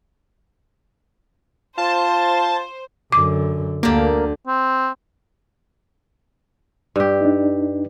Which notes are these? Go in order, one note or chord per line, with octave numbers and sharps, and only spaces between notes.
F4 C5 A5
F#2 D3 D6
D2 D3 A#3 G4
C4
G2 G4
D4 D#4